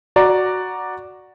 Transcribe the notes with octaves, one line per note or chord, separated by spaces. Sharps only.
F#4 D5 A#5